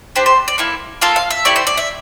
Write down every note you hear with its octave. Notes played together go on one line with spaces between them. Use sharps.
D4 G4 C5
C5
D5
A#3 E4 A4
A#3 F4 A4 F5
F5
E5
A3 E4 G4 D5
C5
D5
E5